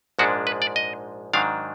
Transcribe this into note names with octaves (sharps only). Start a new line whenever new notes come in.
A#1 G#2 F3 G#3 D4 F#4
B4
D5
D#5
G#2 D#3 F#3 D4 F5